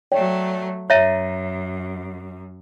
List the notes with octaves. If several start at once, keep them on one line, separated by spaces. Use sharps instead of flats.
F#3 A3 C#5 D5 G5
F#2 C#5 E5 A#5 A#6 D#7